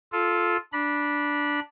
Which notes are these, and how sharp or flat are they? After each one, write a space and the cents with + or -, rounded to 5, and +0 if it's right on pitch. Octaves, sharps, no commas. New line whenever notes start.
F4 +0 A4 -15
D4 +0 B5 -20